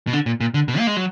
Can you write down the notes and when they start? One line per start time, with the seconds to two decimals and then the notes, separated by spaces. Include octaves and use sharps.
0.07 B2
0.13 D3
0.26 A#2
0.41 A#2
0.54 D3
0.68 B2
0.79 A#3
0.87 G#3
0.97 F#3